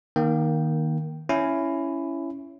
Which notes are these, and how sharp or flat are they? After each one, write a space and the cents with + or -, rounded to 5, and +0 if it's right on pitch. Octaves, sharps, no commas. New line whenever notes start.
D#3 +0 A#3 +15 G5 -10
C#4 +5 E4 +10